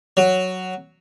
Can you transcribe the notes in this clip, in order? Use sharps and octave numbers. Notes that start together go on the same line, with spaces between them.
F#3